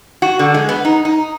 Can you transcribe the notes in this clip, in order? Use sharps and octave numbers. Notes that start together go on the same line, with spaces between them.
F#4
D3
G#3
B3
D#4
D#4